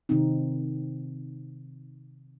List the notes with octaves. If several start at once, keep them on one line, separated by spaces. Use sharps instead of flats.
C3 D#3 C4 D#4